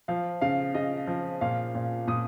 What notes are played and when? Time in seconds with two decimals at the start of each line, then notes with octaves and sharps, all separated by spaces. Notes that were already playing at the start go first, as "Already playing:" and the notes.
0.08 F3 F5
0.41 C#3 F5
0.75 C#3 D#5
1.07 F3
1.41 A#2 F5
1.75 A#2
2.07 A#2 D#6